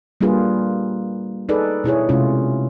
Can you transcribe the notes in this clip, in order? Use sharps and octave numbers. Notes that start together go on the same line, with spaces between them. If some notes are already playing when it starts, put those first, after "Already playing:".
G3 A#3 D4 F4 G#4 B4
D#4 G#4 A4 B4 D5
B2 E4 G#4 C#5
C3 G#3 A3 C#4 E4 F4